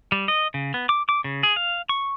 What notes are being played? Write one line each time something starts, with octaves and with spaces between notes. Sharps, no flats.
G3
D#5
C#3
B3
D6
D6
C#3
G#4
F5
C#6